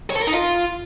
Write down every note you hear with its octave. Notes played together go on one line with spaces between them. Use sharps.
C#5
A4
A#4
D#4
F4